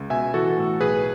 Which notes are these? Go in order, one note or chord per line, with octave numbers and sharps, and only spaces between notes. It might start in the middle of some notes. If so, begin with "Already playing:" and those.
Already playing: C#2
B2 E5 G#5
E3 F#4 A4
A2
B1 G#4 B4